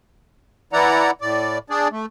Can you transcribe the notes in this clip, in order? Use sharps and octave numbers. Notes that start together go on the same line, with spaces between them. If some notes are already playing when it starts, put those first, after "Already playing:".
E3 E4 D5 F#5 A#5
A2 D5
D4 G#4 D5
A3